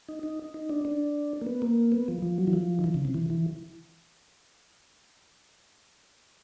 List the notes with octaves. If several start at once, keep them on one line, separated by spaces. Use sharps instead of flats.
D#4
D#4
D#4
D4
D4
A#3
B3
A#3
B3
F3
F3
F#3
E3
F3
D#3
E3
C#3
C3
E3
E3